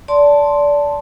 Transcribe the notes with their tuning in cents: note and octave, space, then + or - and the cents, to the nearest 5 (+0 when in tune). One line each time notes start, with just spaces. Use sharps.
D5 -20 A5 +0 C6 +0